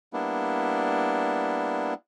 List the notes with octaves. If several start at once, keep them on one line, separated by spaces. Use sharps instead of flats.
G3 A#3 B3 D4 E4